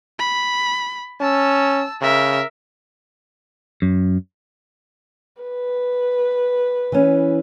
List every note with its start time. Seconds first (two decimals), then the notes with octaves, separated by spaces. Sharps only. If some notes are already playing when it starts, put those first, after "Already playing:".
0.19 B5
1.21 C#4 A5 E6
2.02 C#3 A#4 E5
3.82 F#2
5.42 B4
6.92 E3 C#4